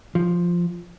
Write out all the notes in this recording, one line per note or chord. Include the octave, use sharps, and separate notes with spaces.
F3